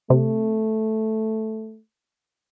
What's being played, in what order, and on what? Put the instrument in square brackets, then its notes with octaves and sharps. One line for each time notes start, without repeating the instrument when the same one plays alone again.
[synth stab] C3 [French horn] A3